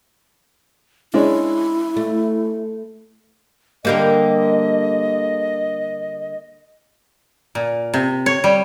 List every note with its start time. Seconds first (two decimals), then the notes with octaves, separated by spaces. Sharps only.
1.14 G#3 C#4 D4 E4
1.97 A3
3.85 D3 G3 A#3 D#5
7.55 A#2
7.94 C3
8.26 C#5
8.44 G3